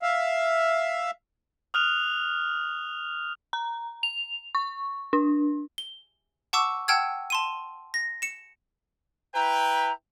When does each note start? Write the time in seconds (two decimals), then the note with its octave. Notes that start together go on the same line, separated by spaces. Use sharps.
0.02 E5 F5
1.74 D#6 F6 F#6 F7
3.53 A#5
4.03 F7
4.55 C#6
5.13 D4
5.78 G7
6.53 F#5 A5 C#6 D6 E6
6.88 F#5 G5 A5 E6 F6 G#6
7.30 A5 C6 D#7
7.94 A#6
8.22 C#7 E7
9.35 E4 B4 G5 A#5